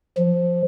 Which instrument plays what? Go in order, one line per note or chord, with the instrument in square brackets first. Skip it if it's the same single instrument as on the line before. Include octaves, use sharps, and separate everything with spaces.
[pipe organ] F3